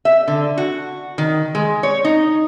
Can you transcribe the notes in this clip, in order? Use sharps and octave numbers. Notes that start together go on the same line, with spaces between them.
E5
D3
F#4
D#3
G#3
C#5
D#4